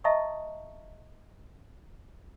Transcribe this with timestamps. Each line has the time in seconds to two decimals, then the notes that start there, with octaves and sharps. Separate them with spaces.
0.04 D#5 E5 A5 A#5 C#6 D#6